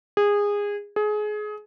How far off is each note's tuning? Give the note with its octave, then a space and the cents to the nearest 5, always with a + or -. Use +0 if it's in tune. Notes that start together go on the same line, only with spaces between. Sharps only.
G#4 -20
G#4 +25